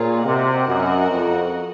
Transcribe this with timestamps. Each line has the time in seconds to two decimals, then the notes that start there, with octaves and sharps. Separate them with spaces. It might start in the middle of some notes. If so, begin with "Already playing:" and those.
Already playing: A#2 F4 G#4 C#5
0.25 C3 F#4 A#4 D#5 F#5
0.68 F#2
1.09 F2